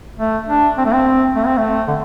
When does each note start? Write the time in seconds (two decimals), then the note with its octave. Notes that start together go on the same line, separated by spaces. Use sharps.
0.18 A3
0.48 D4
0.78 C4
0.85 A3
0.94 C4
1.35 A3
1.47 C4
1.57 A3
1.88 D3